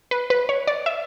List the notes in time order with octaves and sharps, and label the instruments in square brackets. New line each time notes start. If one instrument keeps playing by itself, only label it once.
[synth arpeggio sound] B4
B4
C#5
D5
E5